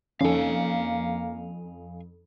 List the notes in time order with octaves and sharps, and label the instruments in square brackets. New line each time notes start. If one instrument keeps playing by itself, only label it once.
[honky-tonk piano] F2 [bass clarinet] A#3 [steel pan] C#4 D#4 A4 [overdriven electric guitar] F5 G#5